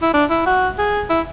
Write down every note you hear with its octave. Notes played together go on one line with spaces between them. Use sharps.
E4
D4
E4
F#4
G#4
E4